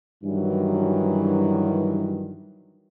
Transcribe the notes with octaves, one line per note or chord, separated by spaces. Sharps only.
G2 D#3 E3 F#3